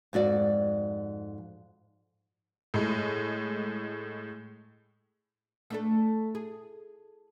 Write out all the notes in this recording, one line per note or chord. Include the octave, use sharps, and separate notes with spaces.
F2 G#2 F#4 D5
A2 G#3
A3 D4 A4
G#4